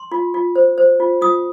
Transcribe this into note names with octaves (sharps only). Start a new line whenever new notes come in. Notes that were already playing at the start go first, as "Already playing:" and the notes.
Already playing: C6
F4
F4
C5
C5
F4
F4 D#6